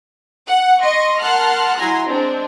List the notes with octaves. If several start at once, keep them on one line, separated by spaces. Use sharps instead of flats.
F#5
D#5 C6 C#6
A#4 F#5 A5 C6 F6 F#6
F#3 E4 G#5 A#5 C6
G#3 C4 D4